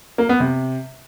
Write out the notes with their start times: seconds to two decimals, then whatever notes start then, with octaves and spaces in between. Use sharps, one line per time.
0.18 A#3
0.29 B3
0.40 C3